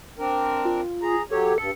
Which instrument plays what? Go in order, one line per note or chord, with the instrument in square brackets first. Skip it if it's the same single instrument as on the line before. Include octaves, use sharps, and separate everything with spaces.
[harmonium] C4 D4 A#4
[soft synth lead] F4
[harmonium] G#4 A#5
[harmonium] F#3 G4 C#5 [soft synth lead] A4
[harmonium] G2 A4 [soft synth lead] C#7